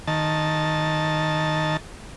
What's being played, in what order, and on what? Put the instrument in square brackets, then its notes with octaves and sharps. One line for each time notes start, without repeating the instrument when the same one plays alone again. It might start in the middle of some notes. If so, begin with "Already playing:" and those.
[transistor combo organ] D#3 A5